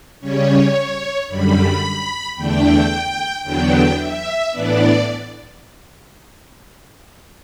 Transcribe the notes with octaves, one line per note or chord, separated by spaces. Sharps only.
C#3 G3 C#4 C#5
F#2 D3 G3 B5
E2 D3 A3 D4 G5
E2 D3 F#3 B3 D4 G5
E5
A2 E3 B3 D4 D5